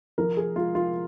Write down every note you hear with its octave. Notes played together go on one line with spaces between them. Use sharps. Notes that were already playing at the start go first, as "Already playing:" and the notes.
F3 A#4
G#4
G#3 F4
F4